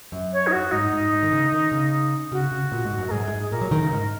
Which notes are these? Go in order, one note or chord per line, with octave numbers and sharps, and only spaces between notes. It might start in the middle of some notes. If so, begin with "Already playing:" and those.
F#2
C#5
D#4
F#4
G#2 D#4
G#2
G#2
D#3
C#3
D#3
C#3
C#3 F#4
C#3
A#2
G#2
F#2
A#4
G#2 G#4
F#2
G#2
A#2 A#4
F#3
D#3
C#3
G#2